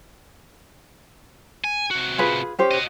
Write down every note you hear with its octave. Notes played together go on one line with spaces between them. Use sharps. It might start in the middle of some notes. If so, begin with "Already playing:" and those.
G#5
C3 F#4
F4 G#4 B4
C#4 G4 C5
F#4 D#5